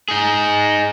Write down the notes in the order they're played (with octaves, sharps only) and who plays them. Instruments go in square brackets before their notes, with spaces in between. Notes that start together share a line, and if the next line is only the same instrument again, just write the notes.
[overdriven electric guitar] D#4 G#4